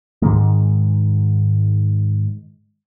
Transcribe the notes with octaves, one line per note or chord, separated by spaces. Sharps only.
G#2 D#3 G#3